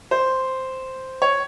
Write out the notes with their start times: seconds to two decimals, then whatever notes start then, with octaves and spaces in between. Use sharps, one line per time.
0.11 C5
1.22 C#5